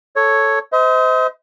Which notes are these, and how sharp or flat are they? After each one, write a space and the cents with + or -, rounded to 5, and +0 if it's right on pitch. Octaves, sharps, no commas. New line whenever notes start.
A4 +0 C#5 +0
C5 -30 D#5 +40